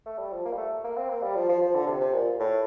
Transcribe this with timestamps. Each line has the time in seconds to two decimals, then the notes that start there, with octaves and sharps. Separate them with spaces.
0.06 A3
0.19 G3
0.32 F3
0.45 A#3
0.53 G3
0.57 A3
0.84 A#3
0.97 C4
1.09 A#3
1.23 G3
1.35 F3
1.49 F3
1.62 F3
1.75 D3
1.87 C3
2.01 C3
2.14 A#2
2.39 A2